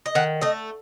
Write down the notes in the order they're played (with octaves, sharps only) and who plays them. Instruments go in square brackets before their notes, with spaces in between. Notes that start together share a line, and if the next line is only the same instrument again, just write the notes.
[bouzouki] D#5
D#3 F#5
A3 D#5